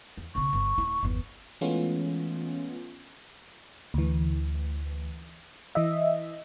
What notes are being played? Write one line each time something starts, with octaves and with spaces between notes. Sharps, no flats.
E2
B1 C#3 C#6
G1 G2
D#1 E4
G1 E2
E3 G#3 A3 B3 C#4 F4
D2 E3
E3 D#5 E5